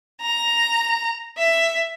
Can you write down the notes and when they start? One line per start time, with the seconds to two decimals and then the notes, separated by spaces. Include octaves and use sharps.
0.20 A#5
1.39 E5